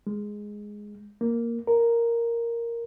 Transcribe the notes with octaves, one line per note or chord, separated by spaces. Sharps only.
G#3
A#3
A#4